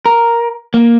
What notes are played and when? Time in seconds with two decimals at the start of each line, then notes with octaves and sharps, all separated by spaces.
0.06 A#4
0.74 A#3